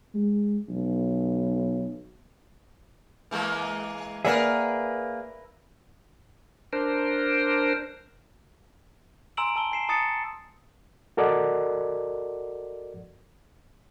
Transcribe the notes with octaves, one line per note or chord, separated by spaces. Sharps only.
G#3
B1
E3 G#3 A#3
A#3 G#4 A#4 B4 D5 E5 F#5
D4 A#4 C5
G#5 A#5 C6 E6 D7 F#7
A5 E6 G7
G#5 C7 E7
A5 A#5 D#6 A6 C#7
F#4 A4 A#4 D5 D#5 F#5